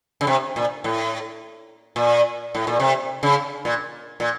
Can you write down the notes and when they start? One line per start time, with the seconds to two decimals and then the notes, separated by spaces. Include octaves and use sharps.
0.21 C#3
0.27 C3
0.56 A#2
0.84 A2
1.96 A#2
2.55 A2
2.67 A#2
2.80 C3
3.23 C#3
3.65 A#2
4.20 A#2